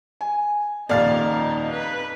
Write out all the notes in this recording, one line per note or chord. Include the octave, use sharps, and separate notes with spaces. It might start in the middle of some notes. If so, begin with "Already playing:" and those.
G#5
D#1 F2 A#2 D#4 D5 F5 A6
B4